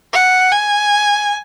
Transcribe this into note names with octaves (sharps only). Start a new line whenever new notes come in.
F#5
G#5